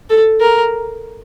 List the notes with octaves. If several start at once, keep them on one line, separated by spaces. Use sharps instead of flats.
A4
A#4